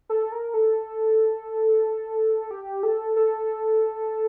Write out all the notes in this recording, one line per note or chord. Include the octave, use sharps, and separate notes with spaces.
A4
A#4
A4
G4
A4
A4